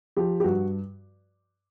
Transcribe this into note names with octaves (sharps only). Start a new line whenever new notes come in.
F3 G4
G4
G2 F#4